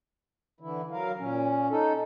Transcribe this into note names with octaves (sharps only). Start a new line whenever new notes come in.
D3 E3 E4
F#3 A#4 F5
A#2 C#4
D#4 A4